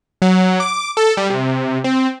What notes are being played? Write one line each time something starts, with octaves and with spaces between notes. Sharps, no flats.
F#3
D6
A4
G3
C3
C4